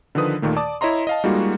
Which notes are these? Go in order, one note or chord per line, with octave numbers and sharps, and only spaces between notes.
D3 D#3 F3 B4 D#6
D#2 A#2 D#3 A3
D5 A5 D6 D#6
E4 C#5 D#5 A#5 C6
D#5 F5 A5
G3 G#3 A#3 D#4 F4 F#4